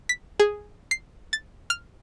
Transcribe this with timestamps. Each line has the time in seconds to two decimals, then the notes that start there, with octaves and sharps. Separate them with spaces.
0.09 B6
0.40 G#4
0.91 C7
1.33 A6
1.70 F6